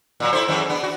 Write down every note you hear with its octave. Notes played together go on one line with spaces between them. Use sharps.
A#2 F#3
E4 A4 C5
F#2 E3 G#3
B3 D4
F#4